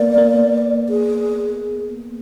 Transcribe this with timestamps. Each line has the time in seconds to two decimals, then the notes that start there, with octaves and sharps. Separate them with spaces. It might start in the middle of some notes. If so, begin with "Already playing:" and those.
Already playing: A#3 B3 D5
0.18 A#3
0.89 G#4